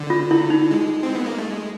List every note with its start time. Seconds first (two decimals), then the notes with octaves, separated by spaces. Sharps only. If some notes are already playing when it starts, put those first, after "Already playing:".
Already playing: D3
0.10 F4
0.31 E4
0.50 D#4
0.71 G#3
1.03 C4
1.15 B3
1.26 A#3
1.38 A3
1.50 G#3